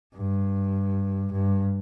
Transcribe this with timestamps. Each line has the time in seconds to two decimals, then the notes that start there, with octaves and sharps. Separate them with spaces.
0.16 G2
1.32 G2